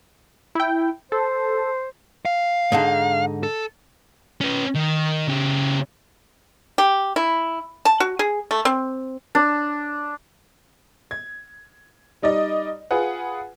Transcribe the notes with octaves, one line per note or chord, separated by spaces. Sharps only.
E4 G5
A4 C5
F5
G#2 D3 D#4
A4
C#4 B4
D#3
C#3 G4
G4
E4
A5
F#4
G#4
A3
C4
D4
G#6
G3 D#4 D5 D#5
F4 G#4 B4 F#5